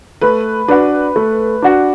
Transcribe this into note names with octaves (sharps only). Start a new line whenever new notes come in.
A3 B4
D4 F#4 B4
A3
D4 F#4